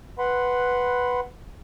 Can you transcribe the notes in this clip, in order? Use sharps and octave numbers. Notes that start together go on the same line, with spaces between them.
B4 F#5 B5 C6